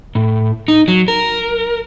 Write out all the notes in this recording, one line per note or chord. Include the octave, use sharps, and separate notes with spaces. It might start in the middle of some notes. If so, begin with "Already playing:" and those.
A2
D#4
F#3
A#4